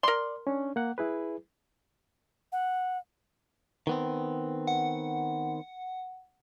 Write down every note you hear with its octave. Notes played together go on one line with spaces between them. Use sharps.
A#4 D5 C6
C#4 D4
A#3 F#5
E4 G#4 B4
F#5
D#3 B3 C4
F#5